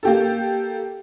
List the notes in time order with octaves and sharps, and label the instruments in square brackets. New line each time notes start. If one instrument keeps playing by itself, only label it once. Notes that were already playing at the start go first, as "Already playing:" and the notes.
[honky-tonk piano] A#3 G4 A4